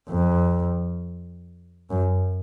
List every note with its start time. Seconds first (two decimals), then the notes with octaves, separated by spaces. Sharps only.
0.09 F2
1.90 F#2